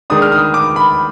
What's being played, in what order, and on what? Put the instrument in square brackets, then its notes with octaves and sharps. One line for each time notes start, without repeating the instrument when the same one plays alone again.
[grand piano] D#3 G#3 D4 D#6
F6
D#6
D6
B5